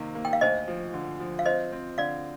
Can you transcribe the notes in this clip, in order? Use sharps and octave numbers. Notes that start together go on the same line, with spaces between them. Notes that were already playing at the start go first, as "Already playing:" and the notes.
Already playing: C3 D#3 A#3
A#3
G5
F5
D2 C5 D#5
F3
D3
F3
F5
C4 C5 D#5
C4
D3 D5 F5